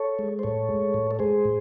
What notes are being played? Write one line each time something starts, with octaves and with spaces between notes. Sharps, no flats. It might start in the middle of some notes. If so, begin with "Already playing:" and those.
Already playing: A4 C#5
G#3
C5
A2 A4 C#5
G#3
A2
A4
G#3 G#4 C5
A2